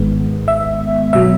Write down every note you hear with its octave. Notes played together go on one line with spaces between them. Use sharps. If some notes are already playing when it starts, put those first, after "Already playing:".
Already playing: G#1 G#2 D#3 G#3 B3
E5
B2 F#3 E5